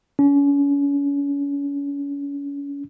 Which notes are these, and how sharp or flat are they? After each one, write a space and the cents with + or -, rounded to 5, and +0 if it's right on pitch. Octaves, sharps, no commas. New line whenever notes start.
C#4 +35